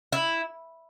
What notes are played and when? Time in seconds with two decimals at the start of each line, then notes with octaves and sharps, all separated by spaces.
0.12 E4